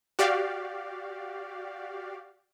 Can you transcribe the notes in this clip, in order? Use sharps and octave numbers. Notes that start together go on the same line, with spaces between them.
F#4 G4 D5 F5